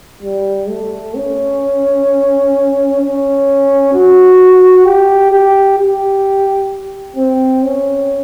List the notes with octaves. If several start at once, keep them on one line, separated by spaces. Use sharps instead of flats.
G3
A3
C#4
C#4
F#4
G4
G4
G4
C4
C#4